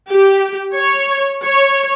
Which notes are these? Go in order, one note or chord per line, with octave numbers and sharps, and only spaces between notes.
G4
C#5
C#5